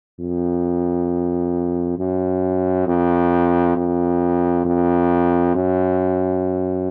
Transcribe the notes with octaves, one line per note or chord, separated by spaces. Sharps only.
F2
F#2
F2
F2
F2
F#2